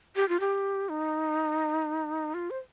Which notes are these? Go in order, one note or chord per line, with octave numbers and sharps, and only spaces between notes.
G4
F4
G4
D#4
F4
C5